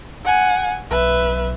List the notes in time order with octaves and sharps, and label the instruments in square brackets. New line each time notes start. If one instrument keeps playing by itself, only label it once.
[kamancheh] F#5 G#5
[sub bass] B1 [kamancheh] B4 E5